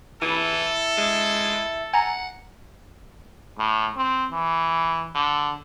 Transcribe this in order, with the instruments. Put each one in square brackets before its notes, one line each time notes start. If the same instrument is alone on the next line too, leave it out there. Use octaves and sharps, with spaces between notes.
[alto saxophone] E3 [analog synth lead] E4 [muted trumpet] A4
[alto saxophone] G#3
[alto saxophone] F#5 [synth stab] G#5 A#5
[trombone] A2
C4
E3
D3